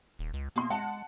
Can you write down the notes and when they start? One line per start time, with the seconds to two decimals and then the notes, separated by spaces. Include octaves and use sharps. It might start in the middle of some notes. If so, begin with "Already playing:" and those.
0.19 D#1
0.34 C#2
0.56 B2 A#3 C6
0.70 G#3 F#5 A5